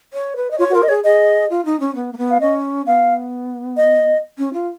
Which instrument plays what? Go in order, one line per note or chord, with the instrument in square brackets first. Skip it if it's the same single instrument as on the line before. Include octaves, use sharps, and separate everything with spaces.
[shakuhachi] C#5
B4
D#5
[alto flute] F4 [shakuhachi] C#5
[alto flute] F#4
[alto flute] F4 [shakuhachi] A#4
[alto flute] D#5
[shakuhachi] G#4 [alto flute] C#5
[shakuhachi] G#4 [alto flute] D#5
[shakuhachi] F4
D#4
C#4
B3
A#3
B3
[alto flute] F5
[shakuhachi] C#4 [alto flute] D#5
[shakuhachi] B3 [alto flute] F5
[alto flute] D#5
[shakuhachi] C#4
F4